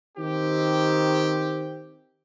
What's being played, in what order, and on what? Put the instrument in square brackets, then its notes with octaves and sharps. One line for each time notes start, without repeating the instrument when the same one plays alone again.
[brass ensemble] D#3 C4 G4